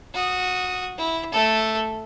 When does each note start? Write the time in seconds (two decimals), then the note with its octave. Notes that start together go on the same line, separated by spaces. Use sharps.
0.14 F#4 D#6
0.98 E4
1.32 A3 A4